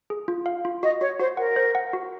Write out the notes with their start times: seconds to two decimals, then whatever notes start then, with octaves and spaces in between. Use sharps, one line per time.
0.10 G#4
0.28 F4
0.46 F5
0.65 F4
0.83 F#4 D#5
1.01 F#4 C#5
1.19 F#4 C5
1.37 A#4 F#5
1.56 C5
1.75 F#5
1.93 F#4